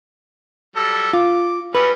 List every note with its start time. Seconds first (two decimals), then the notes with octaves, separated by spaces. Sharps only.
0.76 F#3 G3 A4
1.13 F4 D6
1.75 F#3 G3 C#4 B4